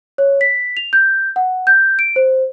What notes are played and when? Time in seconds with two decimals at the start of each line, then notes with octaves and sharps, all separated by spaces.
0.18 C#5
0.41 B6
0.77 F7
0.93 G6
1.36 F#5
1.67 G6
1.99 D7
2.16 C5